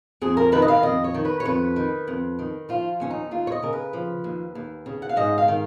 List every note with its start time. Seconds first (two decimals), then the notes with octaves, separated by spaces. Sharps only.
0.21 F2 G#4
0.37 A#4
0.52 D#3 B4
0.62 D#5
0.68 F5
0.83 F2 D#5
1.04 C#5
1.14 D#3
1.25 B4
1.40 C#5
1.45 F2 B4
1.76 D#3
2.08 F2
2.39 D#3
2.69 F3 F4
3.00 D#2 C#4
3.10 D#4
3.31 D#2 F4
3.47 C#5
3.52 D#5
3.63 C#3 A#4
3.73 B4
3.93 F3
4.24 D#2
4.55 D#2
4.86 C#3
5.02 F#5
5.09 F5
5.16 G#2 D#5
5.38 F5
5.48 D#3